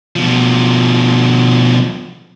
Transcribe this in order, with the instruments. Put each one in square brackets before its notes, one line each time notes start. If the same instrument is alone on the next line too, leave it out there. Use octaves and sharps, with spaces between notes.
[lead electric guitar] B2 F3